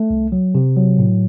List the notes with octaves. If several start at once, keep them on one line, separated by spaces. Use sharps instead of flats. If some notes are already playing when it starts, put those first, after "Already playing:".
Already playing: A3
C2
F#3
C3
F#3
A2